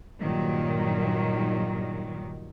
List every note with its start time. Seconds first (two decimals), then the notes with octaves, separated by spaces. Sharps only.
0.20 G2 A#2 D#3 F#3